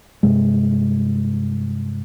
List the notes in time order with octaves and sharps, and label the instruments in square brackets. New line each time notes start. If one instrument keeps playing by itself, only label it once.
[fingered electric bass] G2 C3 G#3